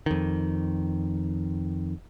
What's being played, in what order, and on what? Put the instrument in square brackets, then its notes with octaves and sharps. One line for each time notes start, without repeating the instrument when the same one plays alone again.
[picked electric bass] F2 D#3